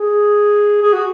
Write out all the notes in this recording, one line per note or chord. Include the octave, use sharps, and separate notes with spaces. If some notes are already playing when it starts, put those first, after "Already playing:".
Already playing: G#4
G#4
F#4